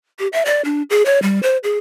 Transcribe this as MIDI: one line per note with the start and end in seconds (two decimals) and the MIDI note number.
0.19 0.27 67
0.33 0.43 76
0.45 0.62 74
0.65 0.82 62
0.90 1.03 68
1.05 1.22 73
1.22 1.40 55
1.43 1.58 72
1.64 1.78 68